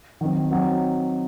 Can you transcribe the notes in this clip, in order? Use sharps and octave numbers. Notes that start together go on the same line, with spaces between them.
D#3 F#3 C4
F#3 C4 D#4